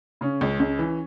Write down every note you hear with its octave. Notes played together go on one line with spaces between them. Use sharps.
C#3 C#4
C#2
C#2
E3